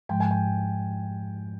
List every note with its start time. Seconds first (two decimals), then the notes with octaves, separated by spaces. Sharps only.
0.09 G#2 F3 G#3 G5
0.20 G#5
0.31 G5